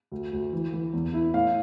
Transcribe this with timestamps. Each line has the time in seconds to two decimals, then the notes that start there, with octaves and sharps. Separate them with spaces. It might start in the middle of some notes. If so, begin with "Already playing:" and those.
0.12 D2
0.33 D2
0.53 E3
0.73 E3
0.93 E2
1.14 E4
1.34 A2 F5